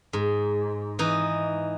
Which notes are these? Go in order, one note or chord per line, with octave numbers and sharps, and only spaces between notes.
G#2
E3 D#4